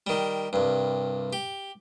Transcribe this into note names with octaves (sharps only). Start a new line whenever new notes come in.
D#3 G3
C2 G2
G4